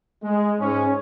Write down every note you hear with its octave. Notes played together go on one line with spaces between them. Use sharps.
G#3
G#2 G#3 C#4